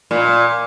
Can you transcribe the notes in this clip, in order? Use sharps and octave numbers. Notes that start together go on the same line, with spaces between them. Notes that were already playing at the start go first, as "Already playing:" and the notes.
A#2